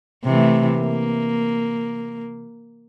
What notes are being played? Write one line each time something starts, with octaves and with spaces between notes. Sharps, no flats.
C3 E3 A3
A#3